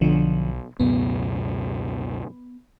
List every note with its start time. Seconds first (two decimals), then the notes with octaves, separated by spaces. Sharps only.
0.01 B1 D3 F3
0.80 C#2 F#2 B2 B3